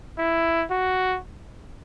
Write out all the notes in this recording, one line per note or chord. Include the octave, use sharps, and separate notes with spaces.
E4
F#4